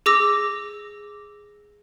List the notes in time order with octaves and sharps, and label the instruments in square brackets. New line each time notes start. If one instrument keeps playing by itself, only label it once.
[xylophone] G#4 D6 E6 A#6